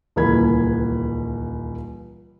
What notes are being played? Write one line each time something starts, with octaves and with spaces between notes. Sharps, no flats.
D#1 C#2 E3 A#3 B5 G#6